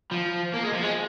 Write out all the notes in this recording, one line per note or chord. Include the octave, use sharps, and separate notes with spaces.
F3
A#3
G#3
F3
G#3